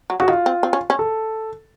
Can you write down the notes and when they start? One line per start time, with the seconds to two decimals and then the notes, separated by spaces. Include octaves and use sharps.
0.10 F#3
0.20 C#3 F#4
0.28 D#3 F4
0.46 C4
0.63 C4
0.73 C#4
0.90 C#4
0.99 A4